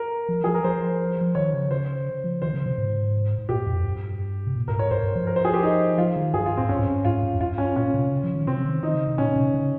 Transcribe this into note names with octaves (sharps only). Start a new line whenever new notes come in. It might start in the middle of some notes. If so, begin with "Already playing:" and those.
Already playing: A#4
F3
F3 G#4
A#4
F3 C5
F3
D#3 C#5
C#3
C5
F3
D#3 C5
C#3
C3
G#2
G#2
A#2 G4
F2
G2
C3
A#2
G2 A#4
G#2
C#5
G2 C5
G2
F3
A#4
C5
G#4
G4
D#4
F3 F4
D#3
G2 G#4
F4
G#2 C4
G2 C#4
G#2
G2
G#2 F4
G2
F2
G2 F4
C#4
A#2 C#4
C3
C#3
F3
D#3
C3 C4
D#3
D#3 D#4
C#3
C3
A#2 C#4
C3
C#3